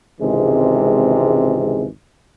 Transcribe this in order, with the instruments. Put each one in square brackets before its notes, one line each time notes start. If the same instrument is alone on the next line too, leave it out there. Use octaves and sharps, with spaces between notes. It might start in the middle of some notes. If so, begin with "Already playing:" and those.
[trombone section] G#1 C#2 C3 E3 G#3